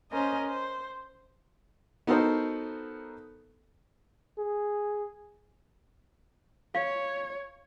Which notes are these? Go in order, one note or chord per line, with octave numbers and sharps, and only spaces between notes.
C#4 A#4 C5 D#5 G#5
C5
B3 D#4 F#4 A4 A#4 C5
G#4
C#5 F5